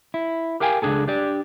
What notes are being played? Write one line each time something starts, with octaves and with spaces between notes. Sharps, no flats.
E4
G4 A#4 F5 G5 G#5
C#2 F#2 D4 G#4 A4
D4 G4 D5